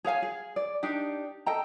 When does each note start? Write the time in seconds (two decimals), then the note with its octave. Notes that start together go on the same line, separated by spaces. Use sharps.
0.05 G#4 C#5 F5 G#5
0.22 G#4
0.56 D5
0.83 D4 D#4 G4
1.46 A4 D#5 G5 A#5